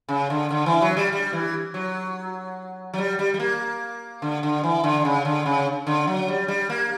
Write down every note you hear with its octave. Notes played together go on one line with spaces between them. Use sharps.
C#3
D3
D3
E3
F#3
G3
G3
E3
F#3
F#3
G3
G3
G3
A#3
D3
D3
E3
D3
C#3
D3
C#3
D3
F#3
G3
G3
A#3